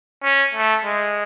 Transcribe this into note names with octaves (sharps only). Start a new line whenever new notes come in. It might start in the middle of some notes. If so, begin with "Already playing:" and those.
C#4
A3
G#3